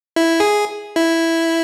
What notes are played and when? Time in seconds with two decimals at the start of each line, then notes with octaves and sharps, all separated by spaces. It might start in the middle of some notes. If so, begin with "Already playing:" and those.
0.16 E4
0.40 G#4
0.96 E4